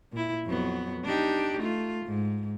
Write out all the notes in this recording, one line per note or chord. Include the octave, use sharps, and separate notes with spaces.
A#2 E4
F2 F#3 B3
D4 D#4 G4
A3 F4
G#2